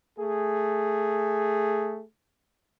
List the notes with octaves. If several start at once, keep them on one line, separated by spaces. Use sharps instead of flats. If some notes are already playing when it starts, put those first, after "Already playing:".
A3 G#4